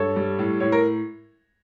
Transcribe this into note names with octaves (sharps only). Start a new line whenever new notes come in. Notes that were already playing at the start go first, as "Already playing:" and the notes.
Already playing: G2 A4 C#5
G3
A2
A2 C#5
A#4